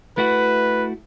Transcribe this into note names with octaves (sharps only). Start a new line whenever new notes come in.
A3 E4 F#4 B4